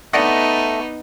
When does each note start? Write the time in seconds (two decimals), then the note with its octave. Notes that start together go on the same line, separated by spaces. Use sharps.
0.13 A3 B3 D#4 D5 D#5 F#5